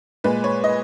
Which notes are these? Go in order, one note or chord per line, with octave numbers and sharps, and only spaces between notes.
A#2 G#3 B4
C#5
D#5